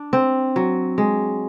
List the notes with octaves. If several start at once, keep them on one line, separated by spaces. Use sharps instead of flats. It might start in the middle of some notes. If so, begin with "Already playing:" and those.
Already playing: D4
C4
F#3
G#3